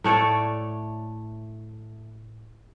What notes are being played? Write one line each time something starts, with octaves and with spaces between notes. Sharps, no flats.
A2 A3 C#5 D5